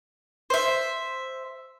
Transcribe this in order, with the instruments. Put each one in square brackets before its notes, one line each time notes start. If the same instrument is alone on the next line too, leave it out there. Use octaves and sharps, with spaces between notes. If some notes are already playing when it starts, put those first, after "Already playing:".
[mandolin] C5 E5